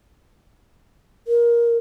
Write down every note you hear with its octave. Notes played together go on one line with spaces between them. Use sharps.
A#4